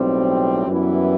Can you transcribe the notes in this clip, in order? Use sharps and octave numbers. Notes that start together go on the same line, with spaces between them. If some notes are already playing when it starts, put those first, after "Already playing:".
Already playing: B1 A2 G3 C4
F#2 E3 G3 B3 E4